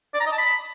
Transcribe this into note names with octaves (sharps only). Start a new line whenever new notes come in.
D5
A#5
D#5
A5
B5